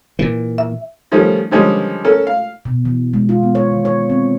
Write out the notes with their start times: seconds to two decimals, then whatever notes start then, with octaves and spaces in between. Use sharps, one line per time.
0.19 A#2 E3
0.58 E5
1.12 D#3 F3 G3 A3 C#4
1.51 D3 D#3 F3 G3 G#3 C#4
2.04 C#4 A4 A#4
2.27 F5
2.65 B2
2.85 E3
3.14 G#3
3.29 F4
3.43 B3
3.55 C#5
3.72 D#3
3.85 C#5
4.10 C4